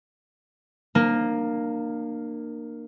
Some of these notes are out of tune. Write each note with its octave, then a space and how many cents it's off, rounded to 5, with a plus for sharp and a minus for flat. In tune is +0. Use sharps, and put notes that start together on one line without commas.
A#3 +0 D4 +40